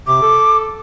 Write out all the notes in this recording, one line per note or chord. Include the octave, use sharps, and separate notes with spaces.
C3 D6
A4